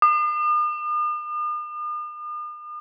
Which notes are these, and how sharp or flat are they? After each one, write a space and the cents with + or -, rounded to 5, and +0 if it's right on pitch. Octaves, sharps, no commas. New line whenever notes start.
D#6 -45